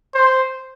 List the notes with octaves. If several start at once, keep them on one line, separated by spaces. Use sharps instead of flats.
C5